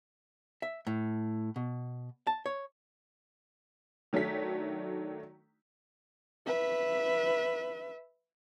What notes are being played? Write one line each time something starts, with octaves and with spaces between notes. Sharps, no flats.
E5
A2
B2
A5
C#5
D#3 F#3 A3 D4 B6
B4 E5